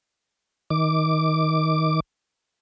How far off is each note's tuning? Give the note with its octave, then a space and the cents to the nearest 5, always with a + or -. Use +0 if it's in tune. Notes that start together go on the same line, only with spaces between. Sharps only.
D#3 +20 D6 +0